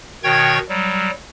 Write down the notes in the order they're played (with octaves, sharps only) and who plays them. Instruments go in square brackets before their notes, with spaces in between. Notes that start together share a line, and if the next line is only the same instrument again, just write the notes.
[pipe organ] B2 D#3 C#5 G5 C#6 G#6
F#3 G3